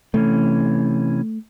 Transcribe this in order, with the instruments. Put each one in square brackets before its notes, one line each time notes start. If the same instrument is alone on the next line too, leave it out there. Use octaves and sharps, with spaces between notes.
[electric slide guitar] C3 E3 C#4 [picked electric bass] A3